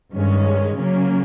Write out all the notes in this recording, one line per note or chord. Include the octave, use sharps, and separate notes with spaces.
G2 D#3 G#3 C#4
C#3 F#3 A#3 C#4